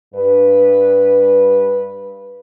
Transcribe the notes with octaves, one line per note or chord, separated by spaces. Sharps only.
G2 B4